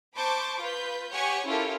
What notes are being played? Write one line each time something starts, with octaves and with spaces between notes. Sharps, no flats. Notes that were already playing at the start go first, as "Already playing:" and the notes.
C5 A5 B5 C#6 D6 G6
F4 B4 G6
G4 C#5 F#5 G#5 C#6
C#4 E4 F4 G4 A4 A#4